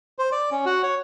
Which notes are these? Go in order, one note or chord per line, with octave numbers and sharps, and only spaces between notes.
C5
D5
C#4
F#4
C#5